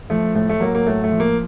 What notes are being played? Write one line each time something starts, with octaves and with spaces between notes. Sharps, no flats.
F3 A3
A2 A3
A3
F#3 A#3
A#3
A2 A3
A3
F3
A#3